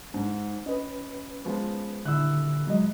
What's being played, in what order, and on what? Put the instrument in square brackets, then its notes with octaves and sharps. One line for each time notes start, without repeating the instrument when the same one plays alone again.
[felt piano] G#2
[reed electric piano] C#4 B4 [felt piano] D#5
[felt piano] F3 G#3 B3
[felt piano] D#1 E4 F#6 [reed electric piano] D3 E6
[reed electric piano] F#3 G#3 D#5